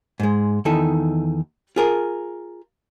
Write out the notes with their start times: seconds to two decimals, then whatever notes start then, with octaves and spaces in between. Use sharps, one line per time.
0.20 G#2 G#3
0.65 E2 D#3 D#4 E4 A4
1.76 F4 G#4 A#4